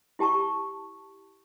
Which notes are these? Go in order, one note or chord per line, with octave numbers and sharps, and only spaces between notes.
E4 G4 A5 A#5 C#6